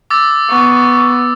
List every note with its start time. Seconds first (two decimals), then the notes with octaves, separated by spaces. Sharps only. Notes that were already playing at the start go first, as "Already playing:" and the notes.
0.10 D6 E6 A6
0.49 B3 C#6